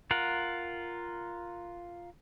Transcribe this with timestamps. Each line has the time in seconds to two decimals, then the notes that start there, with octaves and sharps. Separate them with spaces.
0.11 F4 A#4 F#5